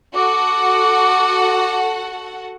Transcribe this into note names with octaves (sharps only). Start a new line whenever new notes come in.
F#4 A4 F#5 D6